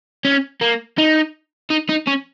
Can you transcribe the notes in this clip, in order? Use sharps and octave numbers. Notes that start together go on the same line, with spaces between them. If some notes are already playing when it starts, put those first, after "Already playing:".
C#4
A#3
D#4
D#4
D#4
C#4